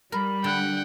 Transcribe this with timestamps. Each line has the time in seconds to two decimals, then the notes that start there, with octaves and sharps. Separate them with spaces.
0.12 G3 A#4 B5
0.44 D3 F#5 G5